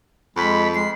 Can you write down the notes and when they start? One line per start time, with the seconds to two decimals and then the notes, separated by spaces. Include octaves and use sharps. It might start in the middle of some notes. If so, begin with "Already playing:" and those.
0.36 F2 G#3 B5
0.75 G#3 C7